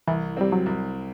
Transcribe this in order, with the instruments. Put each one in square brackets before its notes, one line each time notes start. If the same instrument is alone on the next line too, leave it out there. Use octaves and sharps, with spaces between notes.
[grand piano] C2 [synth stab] E3
[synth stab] G3 [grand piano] C4
[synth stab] F#3
[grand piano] C2